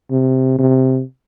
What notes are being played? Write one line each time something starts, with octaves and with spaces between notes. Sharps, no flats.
C3
C3